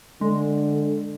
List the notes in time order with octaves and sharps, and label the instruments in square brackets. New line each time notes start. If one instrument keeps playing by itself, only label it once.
[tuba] D3 [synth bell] G#3